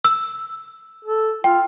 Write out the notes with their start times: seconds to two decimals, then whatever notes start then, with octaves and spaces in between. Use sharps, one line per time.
0.05 E6
1.05 A4
1.44 F4 G5